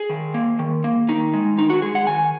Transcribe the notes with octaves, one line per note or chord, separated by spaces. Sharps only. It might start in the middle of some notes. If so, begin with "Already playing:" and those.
Already playing: G#4
D#3
A#3
D#3
A#3
D#3 D#4
G#3
D#3 D#4
F#4
G#3 G#4
F#5
D#3 G#5